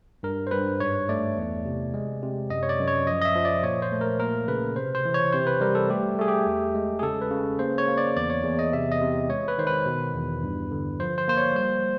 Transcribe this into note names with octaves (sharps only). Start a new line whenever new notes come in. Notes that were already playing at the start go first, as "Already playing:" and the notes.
G2 A#4
C5
G2 B4
G#2 C#5
A3 D5
E2
C3
G#3
C3
F#2 D#5
C#5
D5
F#2
C#5
F3 D#5
D#5
E5
F3
D5
A#2 C#5
C5
A3
A#4
A#3 A#4
C#3 B4
C3 C5
C5
E3
C#5
C3 C5
B4
G3 A#4
A4
A3 G4
A3 G#4
G4
E2
G#3
G#4
C#3 A4
B4
C#3
A#3 C5
C#5
A#3
D5
E2 D5
C#5
E2
D#5
C3 E5
D#5
C3
G#3 C#5
B4
D#3 C5
B4
B2
E2
G2
D3
F3 C5
C5
A#3 C5
C#5
G3 C5